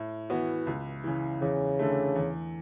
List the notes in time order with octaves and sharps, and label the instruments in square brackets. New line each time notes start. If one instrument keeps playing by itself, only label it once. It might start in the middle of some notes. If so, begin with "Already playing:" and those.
Already playing: [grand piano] A2
E3 B3 F#4
C#2
C#3 E3
[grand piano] E2 [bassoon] C#3
[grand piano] D3 A3
E2